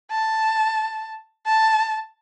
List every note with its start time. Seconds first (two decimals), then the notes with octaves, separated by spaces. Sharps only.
0.10 A5
1.46 A5